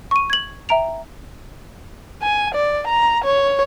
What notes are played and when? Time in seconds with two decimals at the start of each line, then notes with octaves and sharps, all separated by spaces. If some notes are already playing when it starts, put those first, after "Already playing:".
0.11 C#6 D#7
0.30 G#6 F#7
0.69 E5 G5 A#5 D7 F7
2.22 G#5
2.54 D5
2.87 A#5
3.24 C#5